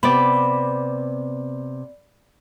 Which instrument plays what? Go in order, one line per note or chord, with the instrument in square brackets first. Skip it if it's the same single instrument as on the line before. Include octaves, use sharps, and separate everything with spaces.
[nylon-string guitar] C3 B3 [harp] D5 B5